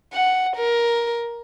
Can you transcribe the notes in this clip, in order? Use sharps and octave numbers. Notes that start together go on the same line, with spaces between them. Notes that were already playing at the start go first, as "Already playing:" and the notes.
F#5
A#4